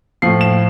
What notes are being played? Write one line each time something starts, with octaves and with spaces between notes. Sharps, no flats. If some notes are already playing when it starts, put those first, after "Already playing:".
A2 F3 C7
E7